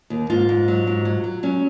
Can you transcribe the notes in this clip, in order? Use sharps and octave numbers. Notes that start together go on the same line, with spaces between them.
D#2
G#2 F4
G#2
F#3
G#2
F#3
F#3
F#3 C#4